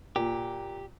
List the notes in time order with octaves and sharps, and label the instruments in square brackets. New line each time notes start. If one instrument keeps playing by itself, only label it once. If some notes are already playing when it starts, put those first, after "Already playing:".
[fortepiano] A#2 [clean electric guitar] G4